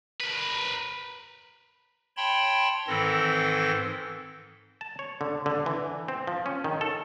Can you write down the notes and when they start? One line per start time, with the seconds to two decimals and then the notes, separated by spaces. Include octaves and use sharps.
0.21 A#4 B4
2.17 C#5 G5 A5 B5 C6
2.88 G#2 D#3 E3 C4 A4 A#6
4.81 A5
4.99 C#5
5.21 D3
5.46 D3
5.66 E3
6.08 C4
6.27 F3
6.46 C#4
6.64 D#3
6.81 A4